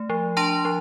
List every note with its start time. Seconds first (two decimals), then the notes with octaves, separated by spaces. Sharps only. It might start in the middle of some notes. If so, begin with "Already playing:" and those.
Already playing: A3
0.10 F3
0.37 D4 A5 C6
0.65 F3